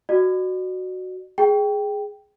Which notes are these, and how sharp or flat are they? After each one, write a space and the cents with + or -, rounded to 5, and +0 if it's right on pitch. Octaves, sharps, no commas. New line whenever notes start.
F#4 +0 D5 +45
G#4 +0 G5 +0